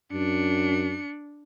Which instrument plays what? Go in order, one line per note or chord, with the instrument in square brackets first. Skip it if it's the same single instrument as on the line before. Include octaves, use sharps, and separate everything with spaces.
[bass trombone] F#2 [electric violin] D4 C#7